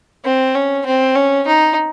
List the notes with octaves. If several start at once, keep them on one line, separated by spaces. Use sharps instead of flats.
C4
C#4
C4
C#4
D#4